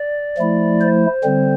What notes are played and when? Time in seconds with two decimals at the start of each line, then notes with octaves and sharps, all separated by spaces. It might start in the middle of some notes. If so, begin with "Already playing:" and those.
Already playing: D5
0.38 F3 A3 E4
0.81 C5
1.24 D3 G3 C4